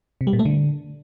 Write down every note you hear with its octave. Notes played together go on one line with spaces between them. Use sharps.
C3
G3
A#2
A3
D3